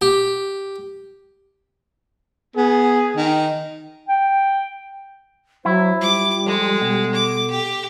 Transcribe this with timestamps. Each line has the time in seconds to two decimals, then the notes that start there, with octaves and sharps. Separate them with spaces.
0.02 G4
2.56 B3 G#4
3.17 D#3
4.09 G5
5.65 F#3 E4 C5
6.01 G3 F4 D6
6.46 F3 G#3 A4
6.81 B2
7.14 D6
7.50 G4